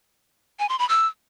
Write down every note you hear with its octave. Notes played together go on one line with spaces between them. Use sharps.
G#5
C6
B5
E6